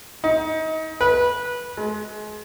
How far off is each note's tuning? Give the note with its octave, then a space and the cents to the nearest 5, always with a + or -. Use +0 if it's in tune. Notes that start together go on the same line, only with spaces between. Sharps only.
D#4 +30
B4 -20
G#3 +30